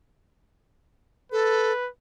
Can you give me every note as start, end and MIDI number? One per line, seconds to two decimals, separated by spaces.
1.32 1.72 69
1.32 1.89 71